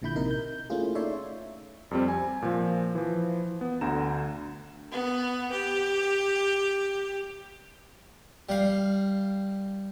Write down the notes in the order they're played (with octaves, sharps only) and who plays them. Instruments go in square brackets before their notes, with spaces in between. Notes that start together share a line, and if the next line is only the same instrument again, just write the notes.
[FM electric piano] A#1 A#2 D3 E4 B5 G6
C3 D#4 A#4
G6
A3 A#3 C#4 E4 F4 G#4
D#4 A4 C#5 D5 E5 C6
[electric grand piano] F2 G3 C4
G#5
A#2 F3
E3 F3
B3
D2 D3 A#5 E7
[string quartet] B3
G4
[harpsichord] G3 F5